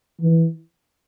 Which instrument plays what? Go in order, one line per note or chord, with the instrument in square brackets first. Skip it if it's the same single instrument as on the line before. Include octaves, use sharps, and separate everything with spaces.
[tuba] E3